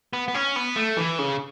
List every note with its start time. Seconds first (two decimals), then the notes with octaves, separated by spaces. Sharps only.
0.13 B3
0.28 B3
0.34 C#4
0.56 B3
0.76 A3
0.97 E3
1.19 C#3